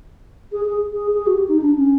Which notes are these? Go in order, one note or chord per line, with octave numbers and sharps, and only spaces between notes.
G#4
G#4
G#4
G#4
F#4
G4
D#4
D4
C#4